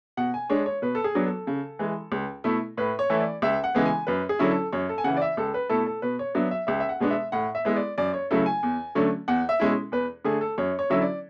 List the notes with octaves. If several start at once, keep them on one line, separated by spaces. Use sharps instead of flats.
B2 F#5
G#5
G#3 D4 C#5
C#5
B2 B4
A4
G#4
F#3 B3 D4
A4
C#3
E3 G#3
C#2
B2 A3 E4
A2 B4
C#5
E3 A3 E4
D5
C#2 E5
F#5
C#3 E3 G#3 B3
G#5
F#2 B4
G#4
D3 F#3 C#4 E4
A4
F#2 C#5
A4
G#5
C#3 E3 F#5
D5
E5
C#2 A4
B4
B2 A3 E4 A4
A4
B2 B4
C#5
F#3 B3 D4 E5
E5
C#2 E5
E5
F#5
B2 G#3 B3 D4
E5
A2 F#5
E5
G#3 B3 E4
D5
F#2 D5
C#5
C#3 F#3 A3 E4 A4
G#5
E2
D3 F#3 A3 C#4
E2 F#5
E5
B2 G#3 C#4 E4
E2 B4
D3 A3 G#4
A4
F#2 C#5
C#5
D3 F#3 C#4 E4 E5
D5